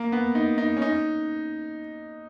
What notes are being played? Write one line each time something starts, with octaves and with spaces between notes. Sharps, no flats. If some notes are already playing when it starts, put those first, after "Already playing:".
Already playing: A#3
B3
D#4
D#4
C#4
D#4